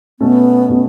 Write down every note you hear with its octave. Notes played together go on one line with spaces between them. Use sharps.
B2 A3 B3 C#4
B2 A3 C#4